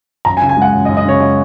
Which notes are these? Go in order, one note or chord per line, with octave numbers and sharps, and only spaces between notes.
F#2 A#5
G#5
C#3
G#5
G#3 F#5
F#2
D#5
F#2
D#5
C#3 C#5
G#3 D#5